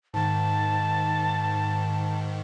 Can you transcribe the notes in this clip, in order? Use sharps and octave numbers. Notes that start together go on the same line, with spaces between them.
G#2 D#3 A5